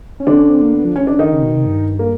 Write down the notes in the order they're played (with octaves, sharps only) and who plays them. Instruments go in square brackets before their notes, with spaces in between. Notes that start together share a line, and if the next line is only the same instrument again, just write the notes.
[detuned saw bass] C#4
[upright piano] D3 D4 [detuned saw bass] C4
[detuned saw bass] C#4
C4
A#3
B3
F3
[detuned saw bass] E3 [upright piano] C#4
[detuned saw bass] D#3 [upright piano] D4
[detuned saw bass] D3 [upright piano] D#3 D#4
[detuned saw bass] C#3
B2
C3
G2
[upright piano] A#3